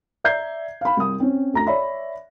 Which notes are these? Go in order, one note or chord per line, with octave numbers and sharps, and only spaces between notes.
D5 E5 A#5 G6 G#6 C7
F5 B5
C2 D#6
C4 C#4
D2 A#5 A#6
C#5 D5 E5 B5